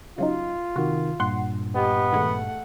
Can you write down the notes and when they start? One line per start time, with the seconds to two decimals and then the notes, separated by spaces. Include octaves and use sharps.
0.18 C#3 F#3 D#4 F4
0.76 C3 D#3 F#4
1.20 G2 A#2 F#5 C6
1.75 B3 G4 D#5
2.12 D#3 G#3 A3 F#5